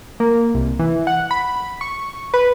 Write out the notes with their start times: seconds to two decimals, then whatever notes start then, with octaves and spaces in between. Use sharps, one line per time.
0.20 A#3
0.54 C2
0.79 E3
1.07 F#5
1.31 B5
1.81 C#6
2.34 B4